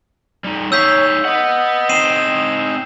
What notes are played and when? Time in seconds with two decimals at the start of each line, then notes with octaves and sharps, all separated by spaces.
0.44 G3 D#4
0.72 D#4 G#4 C#5 F5 E6 G6 B6
1.25 B4 D#5 F#5
1.89 C4 D#4 G5 C7 D#7 E7